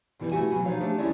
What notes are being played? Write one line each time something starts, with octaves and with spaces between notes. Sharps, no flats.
F2 B2 E3 G3 B3
A3 E4 F#4 G4 G#5
B2 E3 F#3
F3 D#4 F#4 C#5 F5
A3 D4 G4 G#4
E2 G#3 C#4 E4 G#4 D5